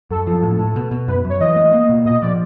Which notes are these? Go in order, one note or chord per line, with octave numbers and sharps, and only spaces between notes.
F#2 A4
F3
A2
A2
B2
B2
F#2 B4
F#2 C#5
E3 D#5
A3
A#3
B2
A#2 D#5
F3 D5